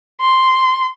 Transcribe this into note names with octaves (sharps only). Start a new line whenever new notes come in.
C6